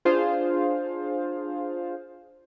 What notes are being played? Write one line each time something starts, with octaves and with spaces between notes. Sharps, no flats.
D4 F4 G#4 C5 F5